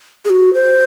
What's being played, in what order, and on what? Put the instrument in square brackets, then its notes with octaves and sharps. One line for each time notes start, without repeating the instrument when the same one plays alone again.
[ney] G#4
F#4
C5